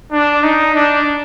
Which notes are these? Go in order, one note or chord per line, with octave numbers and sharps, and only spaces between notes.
D4
D#4
D4